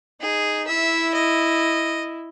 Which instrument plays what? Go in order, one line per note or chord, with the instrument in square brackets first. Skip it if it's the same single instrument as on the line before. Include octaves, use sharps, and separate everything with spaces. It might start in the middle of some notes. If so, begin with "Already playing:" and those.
[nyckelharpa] D#4 [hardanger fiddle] G#4
[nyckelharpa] E4 [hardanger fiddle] E5
[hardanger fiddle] D#5